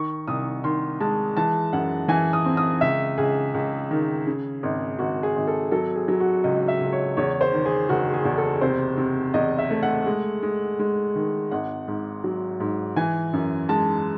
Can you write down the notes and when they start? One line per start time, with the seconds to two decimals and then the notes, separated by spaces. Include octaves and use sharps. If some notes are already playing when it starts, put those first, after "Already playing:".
Already playing: D#3 C#6
0.27 C2 D#6
0.64 D#3 C6
1.00 G#3 A5
1.37 E3 A5
1.73 F#2 F#5
2.08 E3 G#5
2.33 D#6
2.46 C4
2.57 D#6
2.81 C#2 E5
3.18 C#2 G#4
3.54 C#2
3.91 D#3
4.27 C#3
4.63 G#1
4.99 G#1 F#4
5.23 G#4
5.36 G#1
5.47 A4
5.71 F#3 A4
5.96 G#4
6.08 F#3
6.20 F#4
6.44 C#2 D#5
6.68 E5
6.80 C#2
6.92 C#5
7.17 E2 C#5
7.41 C5
7.53 D#3
7.65 G#4
7.89 F#1 F#4
8.14 G#4
8.25 E2
8.38 A4
8.61 C3 C5
8.97 C3
9.34 E2 D#5
9.59 E5
9.71 A3
9.83 F#5
10.06 G#3
10.43 G#3
10.79 G#3
11.15 D#3
11.51 G#1 F#5
11.88 G#2
12.24 F#3
12.60 G#2
12.96 E3 G#5
13.33 F#2
13.69 G#3 A5